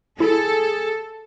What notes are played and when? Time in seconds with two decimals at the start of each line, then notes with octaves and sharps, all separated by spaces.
0.20 E4 G#4 A4